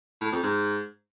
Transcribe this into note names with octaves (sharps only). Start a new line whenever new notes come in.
A2
F2
G#2